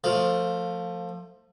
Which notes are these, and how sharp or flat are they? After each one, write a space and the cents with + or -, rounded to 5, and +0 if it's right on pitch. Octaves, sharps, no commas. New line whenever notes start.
F3 +15 A3 +30 F5 +0